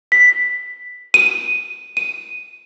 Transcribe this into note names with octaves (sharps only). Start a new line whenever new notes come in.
B6
D#7
D#7